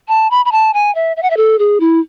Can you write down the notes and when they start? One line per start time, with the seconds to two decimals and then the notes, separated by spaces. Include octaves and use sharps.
0.08 A5
0.31 B5
0.45 B5
0.52 A5
0.74 G#5
0.95 E5
1.16 E5
1.22 F#5
1.30 E5
1.37 A4
1.59 G#4
1.80 E4